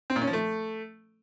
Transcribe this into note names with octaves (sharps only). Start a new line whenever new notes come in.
C4
A#2
C#4
F3
A3